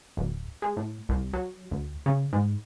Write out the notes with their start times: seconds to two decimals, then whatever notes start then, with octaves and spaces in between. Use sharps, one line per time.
0.17 D1
0.62 G#3
0.77 A2
1.09 C2
1.33 F#3
1.71 D2
2.06 C#3
2.33 G#2